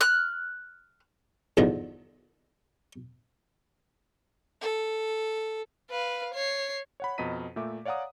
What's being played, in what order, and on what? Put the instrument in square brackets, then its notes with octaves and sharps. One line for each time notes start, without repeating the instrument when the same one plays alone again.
[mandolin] F6 F#6
[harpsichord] E2 G2 D3 D#3 F3
[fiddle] A4
[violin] B4 F5
C#5 C7
[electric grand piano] C#5 F#5 B5
F2 B2 D#5 A#5 B6 D#7
A#2 A3 E5 D6
C#5 D5 F5 F#5 A#5 D#6